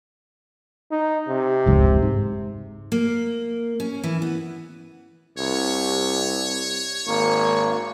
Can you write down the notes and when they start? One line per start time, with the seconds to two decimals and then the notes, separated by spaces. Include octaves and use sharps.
0.92 D#4
1.29 C3
1.66 F1 C#2 G#2
2.02 G#2
2.92 A#3
3.80 C#4
4.04 E3
4.22 B3
5.38 C2 C#5
7.07 G#1 A#3 C#6